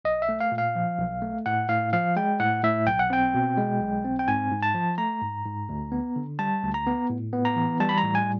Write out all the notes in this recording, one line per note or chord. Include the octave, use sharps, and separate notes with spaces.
B1 D#5
E5
A3
F5
A#2
F5
F3
B1
A3
A2 F#5
A2 F5
F3 F5
G#3 G5
A2 F#5
A2 E5
B1 G5
F#5
C4 G5
B2
G#3
B1
C4
G5
G#2 G#5
G#2
A5
F3
A3 A#5
G#2
G#2
D2
B3
D3
G3 A5
D2
A#5
B3
A2
B3
A#5
E3
G3 A5
B5
A#5
A2
G#5